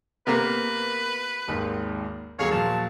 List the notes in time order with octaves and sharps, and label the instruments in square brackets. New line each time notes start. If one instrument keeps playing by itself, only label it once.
[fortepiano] C3 A#3 [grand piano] B3 A#4 [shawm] B4
[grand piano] G#1 D#2 G#2
[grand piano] D#2 F#3 [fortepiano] G#4 F5 [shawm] C#5
[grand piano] A#2 F3 F#3 [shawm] A5